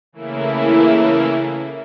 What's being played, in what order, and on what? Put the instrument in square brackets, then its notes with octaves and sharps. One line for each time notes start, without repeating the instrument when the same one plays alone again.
[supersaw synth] C#3 E3 A3 A#3 E4